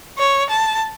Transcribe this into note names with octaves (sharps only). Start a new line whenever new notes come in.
C#5
A5